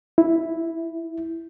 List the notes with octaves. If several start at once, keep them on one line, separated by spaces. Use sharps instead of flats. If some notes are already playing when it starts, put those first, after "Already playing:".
E4